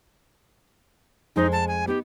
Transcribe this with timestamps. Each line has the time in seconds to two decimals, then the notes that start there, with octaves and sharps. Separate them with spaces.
1.36 F2 G#3 D#4 C5
1.52 A5
1.68 G#5
1.87 B3 D#4 G4